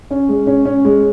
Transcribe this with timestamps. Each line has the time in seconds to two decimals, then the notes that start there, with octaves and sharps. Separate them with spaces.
0.11 C#4
0.29 G#3
0.47 C#4
0.65 C#4
0.85 G#3